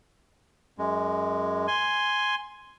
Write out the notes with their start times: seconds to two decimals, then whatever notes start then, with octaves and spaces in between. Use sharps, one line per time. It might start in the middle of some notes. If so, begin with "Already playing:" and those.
0.79 F#2 G#3
1.68 G#5 C6